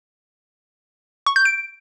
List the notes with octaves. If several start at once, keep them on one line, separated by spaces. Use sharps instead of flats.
C#6
G6
D7